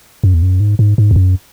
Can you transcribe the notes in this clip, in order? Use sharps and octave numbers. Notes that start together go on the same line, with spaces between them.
F#2
E2
F#2
G#2
G#2
G#2
E2
F#2